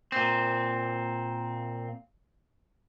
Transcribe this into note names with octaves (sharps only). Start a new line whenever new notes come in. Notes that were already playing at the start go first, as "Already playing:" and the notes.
A#2 C4